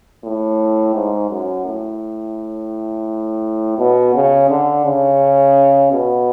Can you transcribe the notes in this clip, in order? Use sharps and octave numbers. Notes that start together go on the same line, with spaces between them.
A2
G#2
F#2
A2
B2
C#3
D3
C#3
B2